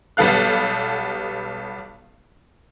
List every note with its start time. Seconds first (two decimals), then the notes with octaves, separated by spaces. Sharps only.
0.17 B1 G3 B3 A4 F5 F#6